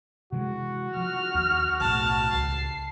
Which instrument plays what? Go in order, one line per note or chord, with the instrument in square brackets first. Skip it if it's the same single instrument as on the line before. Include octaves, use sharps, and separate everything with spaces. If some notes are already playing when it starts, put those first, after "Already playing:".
[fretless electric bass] C3 E3 G#3 [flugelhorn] F#4
[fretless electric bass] F3 [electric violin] F6
[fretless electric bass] D#2
[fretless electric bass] B1 A2 [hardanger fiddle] A5 [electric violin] F6
[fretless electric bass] C#2 [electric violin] C7